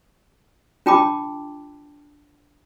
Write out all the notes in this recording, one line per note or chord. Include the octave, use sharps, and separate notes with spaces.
D4 F4 G5 A5 B5 D6